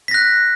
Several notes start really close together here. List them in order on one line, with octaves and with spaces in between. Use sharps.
B6 A#6 F#6